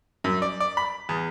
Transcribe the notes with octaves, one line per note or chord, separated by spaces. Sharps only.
F#2
D5
D5
B5
E2